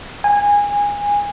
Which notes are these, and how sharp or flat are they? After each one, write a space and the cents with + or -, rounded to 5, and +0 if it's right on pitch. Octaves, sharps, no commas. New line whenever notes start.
G#5 -20